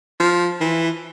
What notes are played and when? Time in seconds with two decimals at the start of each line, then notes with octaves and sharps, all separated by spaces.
0.20 F3
0.61 E3